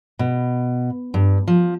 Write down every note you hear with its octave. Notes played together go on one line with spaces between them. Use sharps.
B2
G2
F3